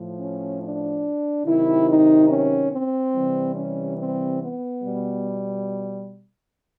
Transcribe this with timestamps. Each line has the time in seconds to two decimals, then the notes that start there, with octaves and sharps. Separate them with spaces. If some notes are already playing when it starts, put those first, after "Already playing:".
Already playing: A2 F3
0.20 C#4
0.62 D4
1.45 C3 D#3 F#3 E4
1.88 D#4
2.29 C#4
2.73 C4
3.14 C3 E3 G3
3.56 C#4
3.98 C4
4.41 B3
4.82 B2 G3